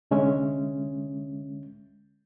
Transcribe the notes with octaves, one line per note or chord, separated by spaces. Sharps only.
C2 D3 G#3 C#4 E5